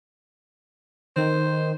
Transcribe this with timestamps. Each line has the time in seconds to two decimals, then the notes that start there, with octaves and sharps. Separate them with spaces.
1.16 D#3 C5